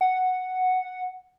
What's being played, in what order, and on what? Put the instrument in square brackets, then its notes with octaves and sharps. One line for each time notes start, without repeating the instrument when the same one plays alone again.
[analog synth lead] F#5